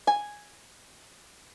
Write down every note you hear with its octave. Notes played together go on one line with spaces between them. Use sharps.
G#5